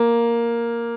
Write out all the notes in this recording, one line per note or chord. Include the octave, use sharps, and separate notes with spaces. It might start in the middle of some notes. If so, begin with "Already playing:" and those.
Already playing: A#3